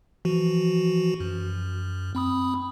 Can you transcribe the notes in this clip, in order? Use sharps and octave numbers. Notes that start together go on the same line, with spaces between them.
E3 F3 F#4
F#2
C4 B5 D#6